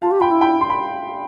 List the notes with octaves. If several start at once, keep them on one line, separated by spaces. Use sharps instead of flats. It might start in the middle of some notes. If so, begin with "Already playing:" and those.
F4 F5 A5
G4
F4 G5 B5
E4
G5 B5
C6
B5